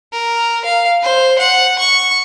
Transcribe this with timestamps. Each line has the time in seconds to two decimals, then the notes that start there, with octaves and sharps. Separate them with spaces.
0.13 A#4
0.65 F5
1.02 C5
1.38 F#5
1.79 C#6